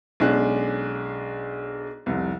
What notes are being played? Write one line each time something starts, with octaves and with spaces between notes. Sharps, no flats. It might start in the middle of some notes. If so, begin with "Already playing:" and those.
B1 G#3 C#4 D4 F#6
F1 C2